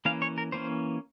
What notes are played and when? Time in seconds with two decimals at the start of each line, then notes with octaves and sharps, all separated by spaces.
0.05 E3 A#3 C#4 F5
0.22 C#5
0.38 A#4
0.52 E3 A#3 C#4 C5